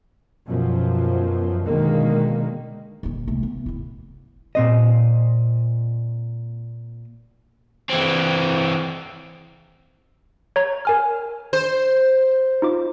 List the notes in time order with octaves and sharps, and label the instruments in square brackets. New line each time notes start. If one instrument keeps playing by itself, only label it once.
[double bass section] F#2 B2 F3
B2 D3 D#3 G#3 A#3
[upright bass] D#1 D3
C2 A3
B3
D1 E4
[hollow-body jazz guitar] A#2 C4 D#5
[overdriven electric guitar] E3 C4
[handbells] C#5 A#5 G#6
A#4 G#5 F6
[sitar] C5
[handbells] D#4 F4 D6